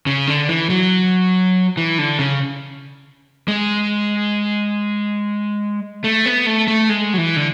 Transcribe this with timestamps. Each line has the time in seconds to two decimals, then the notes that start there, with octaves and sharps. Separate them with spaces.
0.06 C#3
0.27 D3
0.49 E3
0.70 F#3
1.77 E3
1.98 D3
2.19 C#3
3.48 G#3
6.04 A3
6.26 B3
6.46 A3
6.68 A3
6.89 G#3
7.14 F#3
7.18 E3
7.36 D3